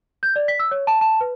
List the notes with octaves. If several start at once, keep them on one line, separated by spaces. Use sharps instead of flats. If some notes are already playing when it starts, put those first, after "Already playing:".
G6
D5
B6
E6
C#5
A5
A5
B4